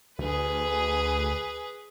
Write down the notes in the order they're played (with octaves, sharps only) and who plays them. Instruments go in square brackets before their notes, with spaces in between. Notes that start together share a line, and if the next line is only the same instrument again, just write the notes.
[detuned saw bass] D2 [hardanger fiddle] G#4 B4